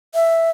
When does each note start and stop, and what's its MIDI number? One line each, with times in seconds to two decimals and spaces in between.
0.15 0.50 76